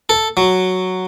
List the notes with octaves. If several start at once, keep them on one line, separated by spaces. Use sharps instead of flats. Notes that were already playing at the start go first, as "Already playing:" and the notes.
A4
F#3